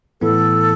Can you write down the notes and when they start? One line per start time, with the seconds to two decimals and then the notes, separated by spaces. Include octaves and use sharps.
0.21 A2 E3 B3 E4 A4